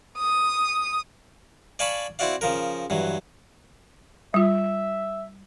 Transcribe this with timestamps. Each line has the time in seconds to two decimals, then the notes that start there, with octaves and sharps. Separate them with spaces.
0.17 D#6
1.79 D5 F5 G#5 A5 B5 C#6
2.19 C4 E4 F#4 D5 F5
2.41 C#3 F3 A#4
2.90 G2 E3 F#3
4.34 G3 F4 E5